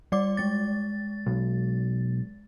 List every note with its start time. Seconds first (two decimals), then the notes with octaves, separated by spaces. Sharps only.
0.12 G3 D5 D6
0.37 G#3 A6
1.27 B1